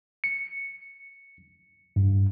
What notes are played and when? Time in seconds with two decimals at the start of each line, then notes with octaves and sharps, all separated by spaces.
0.24 C#7
1.96 G2